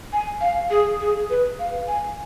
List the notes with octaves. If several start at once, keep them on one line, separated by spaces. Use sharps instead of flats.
G#5
F5
G#4
G#4
B4
F5
G#5